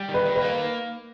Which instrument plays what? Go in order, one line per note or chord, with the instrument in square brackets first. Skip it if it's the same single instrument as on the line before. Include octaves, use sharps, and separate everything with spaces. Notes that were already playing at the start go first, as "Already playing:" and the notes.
Already playing: [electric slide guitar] G3
D#3
[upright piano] B4
[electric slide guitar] D#3
[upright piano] B4
[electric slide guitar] A#3